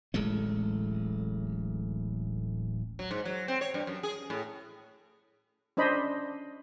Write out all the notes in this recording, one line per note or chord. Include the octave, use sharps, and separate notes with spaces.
D1 A1 G#3 A3
F#3
G#2
F#3
C4
C#5
G2
F#2
G#4
A2
C#4 D4 C5 D#5 B5